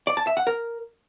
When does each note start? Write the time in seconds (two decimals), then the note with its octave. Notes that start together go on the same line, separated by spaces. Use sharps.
0.07 D5
0.17 A5
0.27 E5
0.37 F#5
0.47 A#4